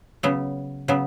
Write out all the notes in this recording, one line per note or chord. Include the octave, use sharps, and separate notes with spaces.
C#3 F#3 B3
C#3 F#3 B3